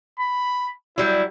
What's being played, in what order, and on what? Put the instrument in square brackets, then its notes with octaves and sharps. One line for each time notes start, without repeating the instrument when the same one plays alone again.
[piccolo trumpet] B5
[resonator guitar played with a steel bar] F#3 G3 [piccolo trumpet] E4